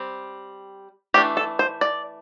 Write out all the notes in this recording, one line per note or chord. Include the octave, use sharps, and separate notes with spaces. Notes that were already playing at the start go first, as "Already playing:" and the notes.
Already playing: G3 C4
E3 A3 D4 G4
A4
C5
D5